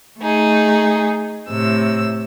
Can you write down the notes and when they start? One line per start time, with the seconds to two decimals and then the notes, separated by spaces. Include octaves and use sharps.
0.18 A3 D#4 G#4
1.49 A2 C3 E6